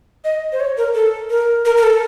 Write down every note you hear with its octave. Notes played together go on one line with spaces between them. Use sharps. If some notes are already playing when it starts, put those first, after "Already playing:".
D#5
C5
C#5
A#4
A4
A#4
A#4
A#4
A4